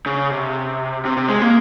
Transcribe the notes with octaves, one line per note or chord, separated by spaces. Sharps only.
C#3
C3
C3
C3
G#3
A#3